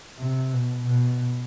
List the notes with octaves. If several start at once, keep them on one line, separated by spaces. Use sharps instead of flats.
C3
B2
B2